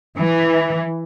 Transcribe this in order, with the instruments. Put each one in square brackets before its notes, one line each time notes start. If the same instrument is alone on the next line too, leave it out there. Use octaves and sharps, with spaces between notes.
[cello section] E3